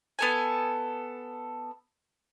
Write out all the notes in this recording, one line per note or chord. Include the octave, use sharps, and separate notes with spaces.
B3 A4 G#5